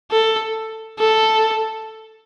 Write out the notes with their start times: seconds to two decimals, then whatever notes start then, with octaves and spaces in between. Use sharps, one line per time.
0.11 A4
0.99 A4